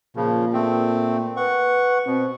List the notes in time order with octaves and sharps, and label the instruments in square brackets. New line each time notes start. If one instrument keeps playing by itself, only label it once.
[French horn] A#2 [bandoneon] C#3 F3
[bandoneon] A3 C4
[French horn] B4 [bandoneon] F#5 C#6
[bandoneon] B2 [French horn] C4